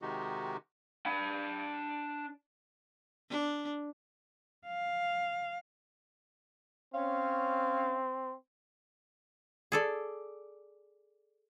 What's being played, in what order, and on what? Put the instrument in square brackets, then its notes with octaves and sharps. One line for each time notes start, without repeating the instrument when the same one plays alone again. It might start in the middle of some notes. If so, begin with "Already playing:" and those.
[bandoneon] C3 D#3 G#3 D#4 F#4 G4
[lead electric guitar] D4 B5
[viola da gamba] D4
[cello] F5
[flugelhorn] C4 [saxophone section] C#4 F5
[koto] G#4 A4 D5